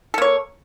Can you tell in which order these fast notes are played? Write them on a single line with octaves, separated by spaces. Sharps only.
A4 A#3 C#5